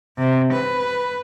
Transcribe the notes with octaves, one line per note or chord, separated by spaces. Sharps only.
C3
B4